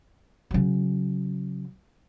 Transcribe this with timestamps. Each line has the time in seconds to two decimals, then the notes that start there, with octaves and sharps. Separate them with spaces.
0.51 C#3 F#3